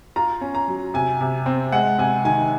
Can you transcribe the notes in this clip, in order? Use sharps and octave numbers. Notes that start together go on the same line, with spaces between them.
F4 A#5
C#4
A#5
F#3
C3 G#5
C3
C4
G#3 F#5
C3 G#5
D#3 G#5